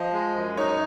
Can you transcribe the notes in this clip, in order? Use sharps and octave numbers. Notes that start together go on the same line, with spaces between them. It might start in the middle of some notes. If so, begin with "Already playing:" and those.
Already playing: F3 D#5
G#3
F#2
D#4 C#5